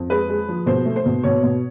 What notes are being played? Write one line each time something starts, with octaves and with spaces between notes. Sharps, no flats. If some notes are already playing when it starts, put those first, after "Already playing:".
Already playing: F2
G#3 B4
G#3
F3
B2 C5
A3
C5
B2
B2 C#5
B2